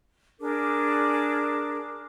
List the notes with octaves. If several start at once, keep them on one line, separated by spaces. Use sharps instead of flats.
D4 G#4 A#4 D6